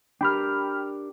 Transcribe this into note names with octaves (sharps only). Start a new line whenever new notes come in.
D4 G4 A#4 G5 B5 F6